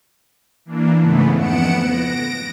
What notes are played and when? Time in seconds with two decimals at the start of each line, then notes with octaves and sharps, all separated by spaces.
0.65 E3 A#3 D4
1.00 G#2 C#3 E3 A3 B3
1.36 F2 B3 F#5 C#7 D7 E7
1.83 A#6 D7